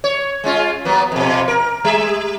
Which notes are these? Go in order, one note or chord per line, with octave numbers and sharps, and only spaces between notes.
C#5
G#3 C#4 F4
F#3 A#3 B3
F2 B2
A#4
G3 E5